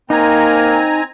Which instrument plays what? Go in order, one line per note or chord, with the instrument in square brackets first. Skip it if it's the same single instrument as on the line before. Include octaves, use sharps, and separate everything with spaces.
[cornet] A#3 [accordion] C4 G#5 A#5 [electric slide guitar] D#4